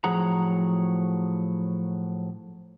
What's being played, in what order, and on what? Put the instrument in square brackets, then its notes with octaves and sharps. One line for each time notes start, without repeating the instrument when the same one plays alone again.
[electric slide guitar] A2 F3 F#3 G#4 F#5 A#5